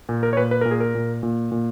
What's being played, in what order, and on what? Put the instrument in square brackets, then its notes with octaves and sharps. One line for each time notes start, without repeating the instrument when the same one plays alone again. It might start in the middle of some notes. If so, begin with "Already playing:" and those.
[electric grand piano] A#2
A#4
C#5
A#2 B4
B4
A#2 A#4
G#4
A#4
A#2
A#2
A#2